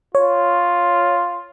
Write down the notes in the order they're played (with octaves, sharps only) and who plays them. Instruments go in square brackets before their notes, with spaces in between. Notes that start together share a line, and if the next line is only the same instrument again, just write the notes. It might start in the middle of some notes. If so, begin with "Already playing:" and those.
[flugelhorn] F4 [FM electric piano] C#5